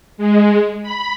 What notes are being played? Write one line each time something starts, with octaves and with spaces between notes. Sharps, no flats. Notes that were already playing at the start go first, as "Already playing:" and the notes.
G#3
B5